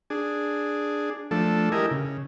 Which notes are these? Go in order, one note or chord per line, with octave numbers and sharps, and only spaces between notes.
D4 G#4
F3 A3 D4 A4
E4 G4 A#4 D#5 G#5
C#3